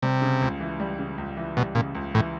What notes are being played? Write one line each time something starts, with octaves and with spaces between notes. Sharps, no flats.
C3 G3
C#3
C#2
E3
G3
C#3
C#2
E3
B2 G3
A#2 C#3
C#2
A2 E3